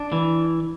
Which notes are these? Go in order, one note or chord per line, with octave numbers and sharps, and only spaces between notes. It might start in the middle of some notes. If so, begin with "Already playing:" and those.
Already playing: D4
E3